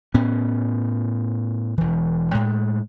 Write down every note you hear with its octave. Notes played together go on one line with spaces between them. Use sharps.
A2 B3 C#4
E1 E3
A2 G#3